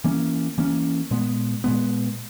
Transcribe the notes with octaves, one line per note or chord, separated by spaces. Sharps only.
E3 A#3 C#4
E3 A#3 C#4
A#2 G#3 B3
A#2 G#3 B3